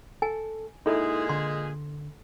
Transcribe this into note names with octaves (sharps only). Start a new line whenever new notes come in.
A4 G#5
A#2 G#3 D#4 E4 G#4 A4 C6
D3 C6